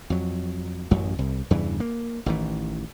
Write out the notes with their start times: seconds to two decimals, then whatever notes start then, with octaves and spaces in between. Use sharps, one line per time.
0.10 F2 F#3
0.91 A1 F#2 F#3
1.19 C2
1.51 E2 G2 C#3 E3
1.80 A#3
2.26 A1 D#3 E3